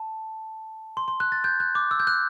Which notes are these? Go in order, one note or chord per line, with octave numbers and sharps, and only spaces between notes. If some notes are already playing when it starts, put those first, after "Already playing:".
Already playing: A5
C6
C6
F#6
A6
G6
F#6
D6
E6
G6
F#6